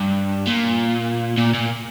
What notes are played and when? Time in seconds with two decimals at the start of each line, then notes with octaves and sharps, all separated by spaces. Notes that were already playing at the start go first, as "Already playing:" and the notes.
Already playing: G2
0.47 A#2
1.38 A#2
1.54 A#2